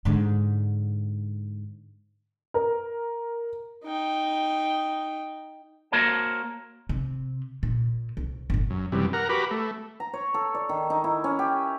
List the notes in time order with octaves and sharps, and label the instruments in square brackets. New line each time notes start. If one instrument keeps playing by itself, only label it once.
[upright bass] G#2 D3
[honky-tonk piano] A#4
[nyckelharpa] D#4 G5
[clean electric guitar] A#3 F#4 A#4 C5 C#5 A5
[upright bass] C3
A#2
C2
G1 A#2
[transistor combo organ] F#2
F#2 C3 E3 G3
A#4 F#5 A#5
F#4 G4 B4 A#5 B5 D6
A3
[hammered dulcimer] A#5
C#5
A4
D5
D#3
D#4
E4
C#4
G4